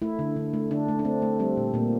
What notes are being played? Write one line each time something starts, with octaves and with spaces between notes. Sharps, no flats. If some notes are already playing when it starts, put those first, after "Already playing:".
A3 E4
D3
D3
A3
D3 D4
A3
D4
A3 C4
A3
G3 C4
A#2
A#2 A#3